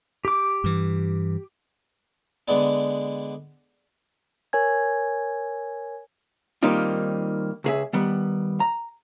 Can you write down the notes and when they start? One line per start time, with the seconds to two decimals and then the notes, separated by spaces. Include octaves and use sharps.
0.25 G4 D6
0.64 G2 E3
2.48 D3 G#3 B3 D4
4.53 A#4 C#5 G#5 G#6
6.63 D#3 G3 A#3 C4 D#4 F4
7.64 C#2 G#4 E5
7.93 D#3 G3 B3
8.60 A#5